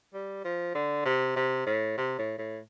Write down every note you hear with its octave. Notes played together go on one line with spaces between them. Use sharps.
G3
F3
D3
C3
C3
A2
C3
A2
A2